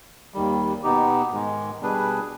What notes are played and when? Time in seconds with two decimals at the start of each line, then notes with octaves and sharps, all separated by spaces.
0.34 D#2 D#3 G3
0.83 B2 B3 D#4 G4
1.31 G#2 D#3 G#3
1.80 B2 G3 D4 G#4 B4